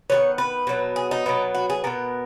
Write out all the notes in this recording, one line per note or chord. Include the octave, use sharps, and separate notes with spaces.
D#3 G#3 B3 C#5
B4
B2 F#3 B3
G#4
D#4
B2 F#3 B3
F#4
G#4
B2 G#3 B3 A#4